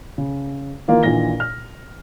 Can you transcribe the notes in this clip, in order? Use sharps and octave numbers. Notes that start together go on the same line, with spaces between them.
C#3
D#3 E3 A#3 F4
A#1 A#2 D#3 E3 A#6 G7
F6